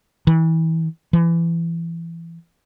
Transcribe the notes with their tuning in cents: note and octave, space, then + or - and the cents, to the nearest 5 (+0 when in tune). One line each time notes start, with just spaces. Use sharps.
E3 -30
E3 +25